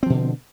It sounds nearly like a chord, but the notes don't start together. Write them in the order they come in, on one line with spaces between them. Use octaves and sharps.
C4 F3 B2 D3